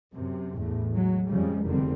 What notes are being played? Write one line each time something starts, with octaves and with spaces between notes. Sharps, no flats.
F#2 C3
A1 E2 A2 A3
F#3 G#3
F2 C#3 F3 G3 G#3
F1 E2 D3 D#3 G3 C4